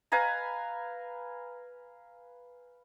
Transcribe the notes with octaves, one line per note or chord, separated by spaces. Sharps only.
B4 F5 G#5 A#5